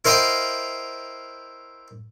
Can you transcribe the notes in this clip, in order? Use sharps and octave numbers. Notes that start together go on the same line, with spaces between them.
E4 A#4 C5 D#5 F5 G5